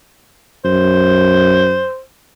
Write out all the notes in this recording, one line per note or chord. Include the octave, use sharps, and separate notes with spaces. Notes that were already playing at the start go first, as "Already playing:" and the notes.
F#2 C5